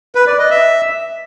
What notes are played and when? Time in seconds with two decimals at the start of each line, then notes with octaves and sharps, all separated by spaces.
0.15 B4
0.27 D5
0.39 D#5
0.50 E5